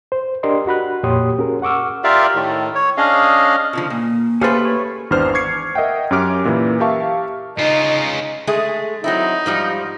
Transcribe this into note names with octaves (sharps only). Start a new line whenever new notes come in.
C5
D4 G4 A#4 D5 D#5 C6
F#4 B5 F#6
F2 A#2 G4 C#5 C6 D#6
C#4 F#4 G#4 A#4
F#5 C#6 D6 E6 F6
F4 G4 A#4 D5 E5 F5
A2 D#3
C#5
C#4 D4 G#4 D#5 F5
B2 D3 F3 F4
A#2 A#3
A3 C#4 G4 G#4 B4 C5 F5 A5
C#5
G#1 E2 D4 B4 C5 F6
C#6 D6 G#6 C7 C#7
A#4 D#5 E5 F#5 G5
F#2 C#4 G4 D6 F6 D7
A#2 E3
G4 A#4 E5 F5 A5 C#6
C#3 D#4 F4
G#3 A3 G#4
F#3 C4 D#4 E4
G#2 F3 G3